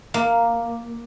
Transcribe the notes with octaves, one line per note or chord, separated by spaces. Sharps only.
A#3